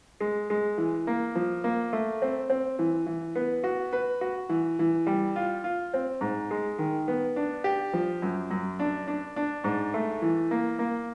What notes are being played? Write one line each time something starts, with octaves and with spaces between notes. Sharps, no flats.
G#3
G#3
E3
A#3
F3
A#3
A3
C4
C4
E3
E3
B3
F#4
B4
F#4
E3
E3
G3
F4
F4
C4
G#2
G#3
D#3
B3
D4
G4
F3
F#2
F#2
D4
D4
D4
G#2
A3
E3
A#3
A#3